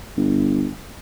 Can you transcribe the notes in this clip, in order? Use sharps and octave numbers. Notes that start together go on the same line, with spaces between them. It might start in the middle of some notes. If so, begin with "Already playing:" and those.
G1